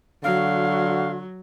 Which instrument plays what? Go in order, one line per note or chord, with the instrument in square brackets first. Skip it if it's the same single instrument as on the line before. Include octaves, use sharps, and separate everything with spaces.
[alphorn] D3 [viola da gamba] F#3 [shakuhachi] F#4 [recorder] F5